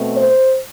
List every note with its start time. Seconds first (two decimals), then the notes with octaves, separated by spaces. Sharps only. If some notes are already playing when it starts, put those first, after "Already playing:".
Already playing: B2 A3 C4
0.16 C5